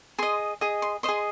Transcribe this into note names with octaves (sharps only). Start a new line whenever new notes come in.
G#4 D#5 C6
G#4 D#5 D#6
C6
C5 D#5 C6
G#4